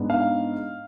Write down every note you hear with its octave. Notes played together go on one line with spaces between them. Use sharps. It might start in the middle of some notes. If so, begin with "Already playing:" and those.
Already playing: G#2 G#3 B3 D4
F5